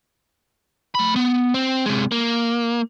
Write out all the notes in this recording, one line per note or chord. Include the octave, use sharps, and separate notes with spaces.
A3 B5
B3
C4
C3 G#3
A#3